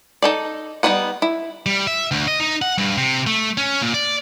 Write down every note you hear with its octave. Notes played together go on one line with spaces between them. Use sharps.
D#4 A4 D5
G3 B3 D#4 B4 F#5
E4
G3
E5
D2
D#5
D#4
F#5
G2
C3
A3
C#4
A#2
D5